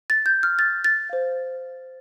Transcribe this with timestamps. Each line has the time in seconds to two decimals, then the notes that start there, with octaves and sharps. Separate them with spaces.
0.10 A6
0.26 G6
0.43 F6
0.59 A6
0.84 A6
1.09 C5 F5